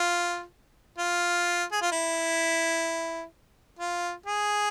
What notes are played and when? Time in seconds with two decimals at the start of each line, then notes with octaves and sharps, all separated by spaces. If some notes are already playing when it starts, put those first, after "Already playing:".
Already playing: F4
0.98 F4
1.72 G#4
1.82 F4
1.92 E4
3.79 F4
4.26 G#4